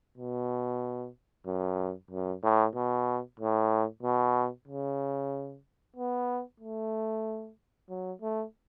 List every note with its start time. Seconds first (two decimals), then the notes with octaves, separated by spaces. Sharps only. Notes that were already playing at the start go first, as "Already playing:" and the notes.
0.17 B2
1.46 F#2
2.11 F#2
2.43 A2
2.75 B2
3.40 A2
4.03 B2
4.68 C#3
5.96 B3
6.60 A3
7.89 F#3
8.22 A3